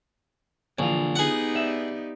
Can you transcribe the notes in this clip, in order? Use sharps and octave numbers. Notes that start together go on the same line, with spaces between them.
A#1 D3 E3 F4
B3 D#4 G4 G#4 F#5
D5 E5